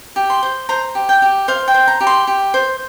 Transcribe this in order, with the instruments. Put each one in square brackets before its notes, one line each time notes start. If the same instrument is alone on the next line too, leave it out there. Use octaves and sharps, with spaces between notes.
[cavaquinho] G4
C6
C5
C5 A#5
G4
G5
G4
C5 F5
G5
C5
A#5
G4
C6
G4
C5